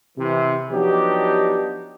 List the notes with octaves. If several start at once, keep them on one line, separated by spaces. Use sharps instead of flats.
C3 E3
F3 F#3 B3 D4 D#4 G4